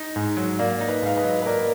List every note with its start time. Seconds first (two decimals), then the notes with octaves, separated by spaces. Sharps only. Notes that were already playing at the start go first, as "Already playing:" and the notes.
Already playing: D#4
0.16 G#2
0.37 F#3
0.59 A#3 D5 F5
0.81 D#4
0.88 B4 D#5
1.02 G#2 F5
1.17 B4 D#5
1.24 F#3
1.42 B4
1.46 A#3 A#4 D5